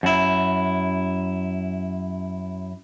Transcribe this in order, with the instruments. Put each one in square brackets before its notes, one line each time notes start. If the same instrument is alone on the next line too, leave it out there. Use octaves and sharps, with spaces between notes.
[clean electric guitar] F#2 E4